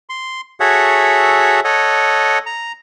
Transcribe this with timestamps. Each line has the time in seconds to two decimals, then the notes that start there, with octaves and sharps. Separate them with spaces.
0.09 C6
0.60 F#4 G#4 A4 C#5 E5 F#5
1.64 A4 C#5 D#5 F#5
2.46 A#5